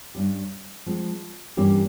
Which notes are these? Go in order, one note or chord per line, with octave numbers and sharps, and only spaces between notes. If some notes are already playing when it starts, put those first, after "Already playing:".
G2 G3 C#4 G4
F3 G#3 C4
G2 E3 A#3 C#4 G4